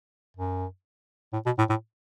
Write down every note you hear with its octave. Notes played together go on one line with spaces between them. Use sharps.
F#2
A2
B2
A2
A2